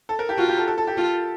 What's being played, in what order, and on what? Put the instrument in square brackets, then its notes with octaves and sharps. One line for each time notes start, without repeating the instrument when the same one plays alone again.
[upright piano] A4
A#4
G4
[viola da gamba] F4 [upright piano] F#4
[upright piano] G4
A4
A4
A4
G4
[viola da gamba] F4